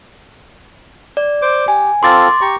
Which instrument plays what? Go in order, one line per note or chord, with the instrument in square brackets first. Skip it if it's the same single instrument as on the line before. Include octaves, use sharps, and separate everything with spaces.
[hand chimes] D5
[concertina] C5 D6
[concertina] G4 [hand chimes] G#5
[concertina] C4 F4 A4 [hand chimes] C6 D6 A6
[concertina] G4 A#5 C#6